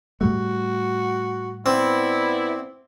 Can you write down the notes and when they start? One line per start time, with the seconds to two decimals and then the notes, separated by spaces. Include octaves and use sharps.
0.21 A2 G3 A3 F#4
1.66 B3 C4 E4 D5